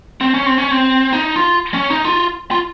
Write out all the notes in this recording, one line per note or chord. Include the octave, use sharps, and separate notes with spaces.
C4
C#4
C4
C#4
C4
D#4
F4
C#4
D#4
F4
F4